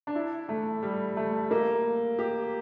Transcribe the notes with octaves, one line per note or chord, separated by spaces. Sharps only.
D4
E4
A3
G3
A3
A#3
G4